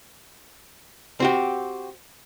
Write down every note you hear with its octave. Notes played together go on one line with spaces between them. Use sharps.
C4 F#4 G4